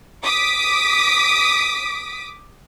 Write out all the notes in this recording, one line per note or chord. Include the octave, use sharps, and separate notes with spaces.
D6 D#6 B6 D7